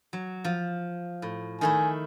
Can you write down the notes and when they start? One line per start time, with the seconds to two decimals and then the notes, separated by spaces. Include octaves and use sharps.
0.13 F#3
0.44 F3
1.22 A2
1.61 D#3 A3 E4 G#5